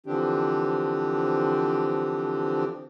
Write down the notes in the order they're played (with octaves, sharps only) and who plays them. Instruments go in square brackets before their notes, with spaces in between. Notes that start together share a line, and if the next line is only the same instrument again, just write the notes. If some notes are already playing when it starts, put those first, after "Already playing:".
[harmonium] D3 E3 F3 C4 D4 G4